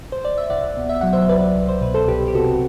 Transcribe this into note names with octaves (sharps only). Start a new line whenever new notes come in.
C5
D5
E5
C2 D5 F#5
B2
E5
F#3 F#5
C5 E5
C2 B4 D5
C2
C5
B2 B4
A4 C5
C2 G4 B4
G4
C3 F#4 A4